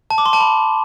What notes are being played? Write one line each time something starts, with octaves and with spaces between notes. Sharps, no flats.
A5
D6
C6
A5
B5